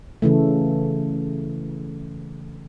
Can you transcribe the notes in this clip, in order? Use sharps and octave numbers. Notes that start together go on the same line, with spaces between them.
C#3 E3 A3